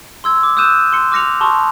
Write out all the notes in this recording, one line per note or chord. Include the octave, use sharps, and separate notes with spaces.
C6 E6 G#6
D6
D#6 E6 F#6 G6 D#7 E7
C6 C#7
D6 F6 A#6 C#7 F7
A5 C6 C#6 D#6